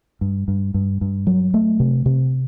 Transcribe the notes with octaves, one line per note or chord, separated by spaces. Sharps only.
G2
G2
G2
G2
F#3
A3
C3
C3